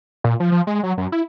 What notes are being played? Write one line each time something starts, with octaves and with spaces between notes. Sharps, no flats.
A#2
F3
F3
G#3
F#3
F#2
E4